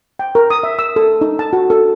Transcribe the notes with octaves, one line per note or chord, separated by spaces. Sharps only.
G5
A#4
D#6
E5
E6
A4
D#4
A5
F#4
A4